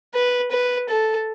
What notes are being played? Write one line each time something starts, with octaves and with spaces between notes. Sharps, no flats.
B4
B4
A4